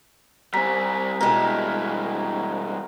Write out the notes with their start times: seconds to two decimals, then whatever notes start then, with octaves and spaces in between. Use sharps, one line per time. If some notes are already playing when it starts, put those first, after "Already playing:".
0.54 G3 C4 G#5 A#5 B6
1.20 G2 B2 E3 G#3 A#4